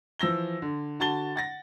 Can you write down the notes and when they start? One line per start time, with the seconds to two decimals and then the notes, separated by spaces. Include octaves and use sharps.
0.19 E3 F3 E6 A#6 G7
0.62 D3
1.00 D3 F#4 A5 A6 G7
1.36 F#5 A6 A#6